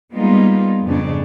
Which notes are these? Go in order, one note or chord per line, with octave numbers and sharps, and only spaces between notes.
G3 G#3 A#3 B3 D#4 F4
F2 G#2 C#3 B3 D4